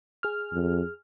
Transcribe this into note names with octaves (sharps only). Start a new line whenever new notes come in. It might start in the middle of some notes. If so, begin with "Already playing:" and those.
G#4 F6
F2